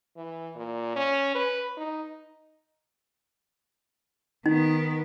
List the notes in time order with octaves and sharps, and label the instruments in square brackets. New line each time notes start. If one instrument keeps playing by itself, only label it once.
[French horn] E3
A#2
C#4
B4
D#4
[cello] D#3 B3 [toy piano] D#4